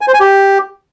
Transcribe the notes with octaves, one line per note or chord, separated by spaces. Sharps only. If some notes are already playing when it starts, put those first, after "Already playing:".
G#5
C5
G#5
G4